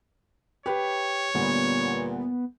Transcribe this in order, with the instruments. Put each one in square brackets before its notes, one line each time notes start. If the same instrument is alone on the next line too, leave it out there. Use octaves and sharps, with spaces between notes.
[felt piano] G4 B4 [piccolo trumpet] C#5
[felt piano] D2 G3 [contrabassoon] A#2 [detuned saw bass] B3